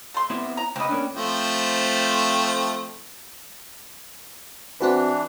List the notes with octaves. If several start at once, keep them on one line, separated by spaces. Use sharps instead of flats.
A3 C6
B3 C4 E4
A#5
C#2 C4 B4 D#5
A#3 C#4 D4
F3 A3 C4
E3 C4 D4 F#4 B4